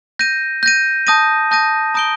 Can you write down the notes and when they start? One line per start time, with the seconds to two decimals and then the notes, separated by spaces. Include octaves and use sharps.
0.19 G6 A#6 D#7
0.63 G6 A#6 D#7
1.07 A5 D#6 G6 A#6 D#7
1.51 A5 D#6 G6 A#6 D#7
1.94 A#5 D#6 G6 D7 G7